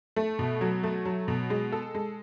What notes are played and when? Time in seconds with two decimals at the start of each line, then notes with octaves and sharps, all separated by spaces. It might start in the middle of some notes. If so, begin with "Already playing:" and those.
0.16 A3
0.39 B2
0.61 F#3
0.83 A3
1.05 F#3
1.28 B2
1.50 G#3
1.72 A4
1.94 G#3